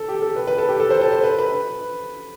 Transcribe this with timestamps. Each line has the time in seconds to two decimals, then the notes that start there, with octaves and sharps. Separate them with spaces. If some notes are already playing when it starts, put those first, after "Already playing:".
Already playing: A4
0.08 G4
0.22 A4
0.36 B4
0.47 B4
0.58 A4
0.69 G4
0.80 A4
0.91 C5
1.01 A4
1.12 C5
1.23 B4
1.39 B4